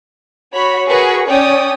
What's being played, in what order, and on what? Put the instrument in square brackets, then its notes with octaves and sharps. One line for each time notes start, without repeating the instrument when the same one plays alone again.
[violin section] F#4 C#5 B5
F#4 G#4 A#4 B4 C#6
C#4 C#5 D5 G5 D#6